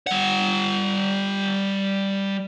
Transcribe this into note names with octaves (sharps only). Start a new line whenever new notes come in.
G3 F#5